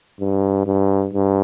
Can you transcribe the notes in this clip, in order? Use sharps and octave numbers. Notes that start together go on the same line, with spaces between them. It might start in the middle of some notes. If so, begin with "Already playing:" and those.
G2
G2
G2